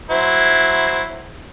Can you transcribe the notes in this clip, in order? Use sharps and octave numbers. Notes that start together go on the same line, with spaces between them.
F#3 E4 C5